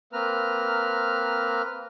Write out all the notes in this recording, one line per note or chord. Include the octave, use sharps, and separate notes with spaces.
A#3 C4 B4 A#5 F6